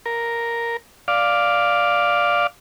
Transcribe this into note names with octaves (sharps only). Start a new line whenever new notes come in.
A#4
D5 F5